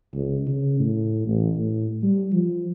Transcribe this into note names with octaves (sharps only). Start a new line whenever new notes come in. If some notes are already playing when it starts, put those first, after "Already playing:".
C#2
C#3
A2
A1
A2
G3
F3